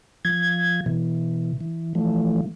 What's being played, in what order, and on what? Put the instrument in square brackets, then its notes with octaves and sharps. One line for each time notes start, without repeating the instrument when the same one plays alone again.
[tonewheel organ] F3 G#6
B2 E3
E3
E3 F3 A3